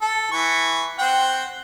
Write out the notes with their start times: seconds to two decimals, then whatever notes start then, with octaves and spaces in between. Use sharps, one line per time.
0.02 A4
0.32 E3 C#6
0.99 C4 F#5 G5